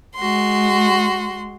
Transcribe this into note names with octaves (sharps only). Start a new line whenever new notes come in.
G#3 F#4 C6